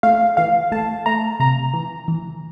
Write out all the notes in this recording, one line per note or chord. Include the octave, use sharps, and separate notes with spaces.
A3 F5
E3 F5
A3 A5
A3 A#5
C3 A#5
E3
E3